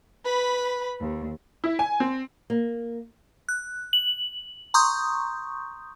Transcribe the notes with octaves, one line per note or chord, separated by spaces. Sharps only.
B4 B5
D#2
E4
G#5
C4
A#3
F#6
F#7
A#5 C6 C#6 D#6 G6